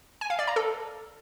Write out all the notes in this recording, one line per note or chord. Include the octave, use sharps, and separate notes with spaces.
G#5
F5
D5
A#5
A4